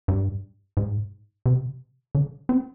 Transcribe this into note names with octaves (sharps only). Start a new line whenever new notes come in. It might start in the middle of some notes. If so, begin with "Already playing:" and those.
G2
G#2
C3
D3
C4